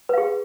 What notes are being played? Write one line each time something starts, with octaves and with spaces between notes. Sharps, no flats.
G#4 B4 F5